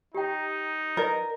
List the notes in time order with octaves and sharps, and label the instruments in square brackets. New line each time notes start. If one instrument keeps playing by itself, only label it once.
[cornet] D#4 [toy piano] G4 G5
[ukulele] A#4 [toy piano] B4 D5 D#5